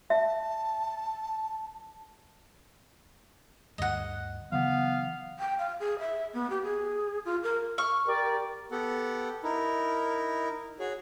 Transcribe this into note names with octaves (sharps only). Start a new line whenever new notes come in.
E5 A5
D2 G2 D#5 F#5
C#3 E3 F#3 B3 F5
G5
F5
G#4
E5
B3
G4
G#4
F4
A#4
C#6 F6
G4 A#4 D5
B3 G4 A4 F#5
D#4 E4 A#4
F#4 G#4 C#5